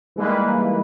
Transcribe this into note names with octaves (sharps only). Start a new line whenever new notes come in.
E3 G3 G#3 A#3 D#4 B4